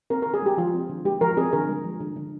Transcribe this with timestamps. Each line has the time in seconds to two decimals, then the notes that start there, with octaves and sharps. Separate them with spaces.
0.10 C4 A#4
0.22 A#4
0.26 D3
0.34 G#4
0.42 G#3 G4
0.58 F3 F4
0.74 C4
0.89 D3
1.05 G#3 G4
1.21 F3 A#4
1.37 C4 G#4
1.53 D3 A#4
1.68 G#3
1.84 F3
2.00 D3
2.16 D3